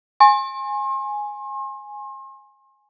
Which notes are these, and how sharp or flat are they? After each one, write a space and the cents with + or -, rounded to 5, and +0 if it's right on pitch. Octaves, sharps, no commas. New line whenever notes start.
G#5 +0 C6 +40